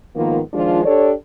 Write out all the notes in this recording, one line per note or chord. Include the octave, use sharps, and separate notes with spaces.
G#2 D#3 F3 A#3 B3 F4
D#3 F3 G#3 D4 F4
D4 G4 A4 C#5 D5